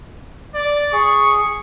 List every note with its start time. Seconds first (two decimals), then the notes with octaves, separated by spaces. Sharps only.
0.55 D5
0.93 G#4 C#6